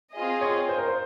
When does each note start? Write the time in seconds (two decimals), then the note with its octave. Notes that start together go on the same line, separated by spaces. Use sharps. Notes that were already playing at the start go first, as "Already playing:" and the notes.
0.13 C4 F4 G#4 D#5
0.41 C#5
0.69 C5
0.78 A#4
0.88 C5